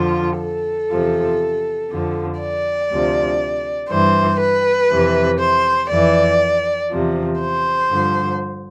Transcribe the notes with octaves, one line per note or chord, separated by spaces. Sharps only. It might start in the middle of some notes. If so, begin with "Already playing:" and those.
Already playing: F2 D3 F3 F4
A4
E2 C3 F3
F2 D3 F3
D5
D2 C3 F3
G2 E3 C5
B4
F2 C3 E3
C5
F2 E3 D5
E2 C3 F3
C5
G2 D3 F3